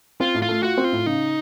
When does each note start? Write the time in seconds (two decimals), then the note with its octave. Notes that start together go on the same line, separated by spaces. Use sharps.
0.20 C4 F4
0.34 A2
0.42 F4
0.49 A3
0.63 F4 F#4
0.77 C4
0.84 F4
0.92 A2
1.06 C#3 D#4